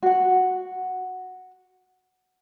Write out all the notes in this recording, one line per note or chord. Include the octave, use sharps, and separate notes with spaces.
F#4 F#5